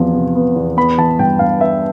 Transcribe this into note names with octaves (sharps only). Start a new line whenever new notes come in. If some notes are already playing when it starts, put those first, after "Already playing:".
Already playing: E2 C3 F3 B3
C3
B3
E2
B3 B5
E3 A5
G2 G5
G2 F5
B3 E5